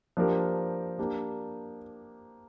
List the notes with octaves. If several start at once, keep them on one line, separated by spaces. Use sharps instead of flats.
F3 A#3 D4 G4 A#4
A#3 D4 G4